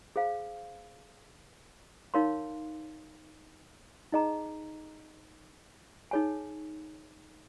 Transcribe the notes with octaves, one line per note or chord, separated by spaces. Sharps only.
G#4 C5 F5
D#4 A#4 C#5 F5 C6
D#4 G#4 D#5 A#5
D#4 G#4 C#5 G#5